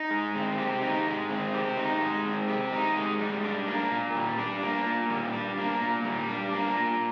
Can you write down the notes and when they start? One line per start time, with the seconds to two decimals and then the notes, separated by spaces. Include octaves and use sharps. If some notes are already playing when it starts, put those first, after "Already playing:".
Already playing: D#4
0.10 G#3
0.35 C4
0.58 G4
0.82 D#4
1.07 G#3
1.30 C4
1.54 G4
1.77 D#4
2.01 G#3
2.25 C4
2.48 G4
2.73 D#4
2.96 G#3
3.19 G3
3.44 D4
3.67 A#3
3.91 A#2
4.15 G3
4.39 D4
4.63 A#3
4.86 A#2
5.10 G3
5.33 D4
5.58 A#3
5.80 A#2
6.04 G3
6.29 D4
6.53 A#3
6.76 A#2